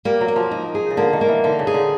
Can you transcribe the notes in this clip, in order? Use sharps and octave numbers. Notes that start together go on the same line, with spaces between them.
G3 A#3
F#3
A#3
F3
D#4
G#4
C#3
D3 A#3
D#3
A#3
E3
D3 D#4
C#3
G#4
D3